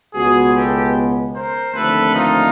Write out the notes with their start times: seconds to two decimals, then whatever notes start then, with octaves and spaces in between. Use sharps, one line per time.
0.14 C#2 B2 G#3 B3 F#4 G#4
0.55 G4 A4
1.34 A#4 C5
1.74 D#2 D3 F3 A3 C4 A4 B4
2.13 D#4 F4